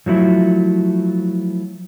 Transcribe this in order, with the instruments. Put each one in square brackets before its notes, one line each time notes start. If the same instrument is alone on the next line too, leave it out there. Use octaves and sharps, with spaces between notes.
[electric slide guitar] F3 F#3 A3 E4